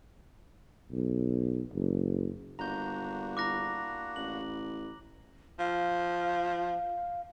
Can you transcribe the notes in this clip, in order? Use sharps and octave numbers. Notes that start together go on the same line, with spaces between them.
B1
F#1
G1 A#3 D4 F#4 A#5 G6
E4 A#5 D6 F#6 A#6
A1 F#7
F3 F5